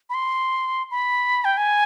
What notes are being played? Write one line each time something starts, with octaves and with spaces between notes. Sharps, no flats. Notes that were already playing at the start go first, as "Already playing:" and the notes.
B5
C6
B5
G5
G#5